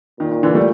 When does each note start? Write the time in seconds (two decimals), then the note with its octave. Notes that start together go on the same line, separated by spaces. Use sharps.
0.20 A#2 D#3
0.31 D#3
0.43 D3 E3
0.55 G3 A3